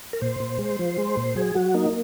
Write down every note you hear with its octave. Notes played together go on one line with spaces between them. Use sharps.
A#4
A#2 C5
A#2
G#3
F3
G#3
A#2
F#3 G#4
F#3 F#4
A#3 D#4